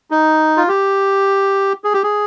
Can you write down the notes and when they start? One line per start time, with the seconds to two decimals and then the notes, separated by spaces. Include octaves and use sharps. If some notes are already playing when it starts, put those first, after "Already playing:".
0.11 D#4
0.57 F4
0.68 G4
1.84 G#4
1.94 G4
2.03 G#4